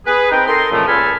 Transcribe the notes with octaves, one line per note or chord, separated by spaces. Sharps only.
G#4 B4
C4 D#4 A#4 B4 G5
A4 A#4 D#5 C6
A#2 C#3 E3 F3 A3
C#2 A#2 A4 G#5 B5 F6